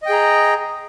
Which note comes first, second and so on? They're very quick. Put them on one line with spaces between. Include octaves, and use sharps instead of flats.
D#5 G5 G#4 A#5